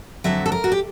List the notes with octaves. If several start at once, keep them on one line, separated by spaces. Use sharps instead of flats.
F2 D3 F#3 E5
A4
A#4
F#4
G4